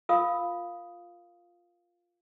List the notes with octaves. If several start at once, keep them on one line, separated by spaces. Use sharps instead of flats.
F4 A#4 F5 D#6